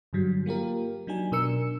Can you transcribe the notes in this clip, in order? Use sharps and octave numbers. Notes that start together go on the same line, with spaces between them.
G2 D3 F#3 G3
A#3 F4 G4 A#4
F#3 D4 D#4 G#5
B2 D4 A#4 E6 C#7